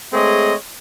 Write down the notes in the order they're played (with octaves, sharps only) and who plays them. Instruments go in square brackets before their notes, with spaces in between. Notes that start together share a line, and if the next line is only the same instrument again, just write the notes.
[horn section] G#3 A3 C4 G#4 C#5 D#5